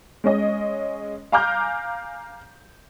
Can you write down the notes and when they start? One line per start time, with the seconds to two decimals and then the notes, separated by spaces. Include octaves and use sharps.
0.24 G#3 C#4 D#5
1.32 F5 G#5 A#5 D6 F6 G6